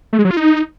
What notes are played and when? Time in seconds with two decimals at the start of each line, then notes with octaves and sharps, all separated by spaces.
0.13 A3
0.19 G#3
0.25 F#3
0.31 F4
0.37 D#4